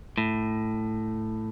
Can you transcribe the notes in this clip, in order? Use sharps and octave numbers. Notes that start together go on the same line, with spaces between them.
A2